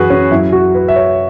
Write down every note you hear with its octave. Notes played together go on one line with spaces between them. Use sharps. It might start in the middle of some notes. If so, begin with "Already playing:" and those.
Already playing: F#2 E3 F#4 G#4 B4
C#4
F#2 F#3 E4
F#4
B4
E5
C#5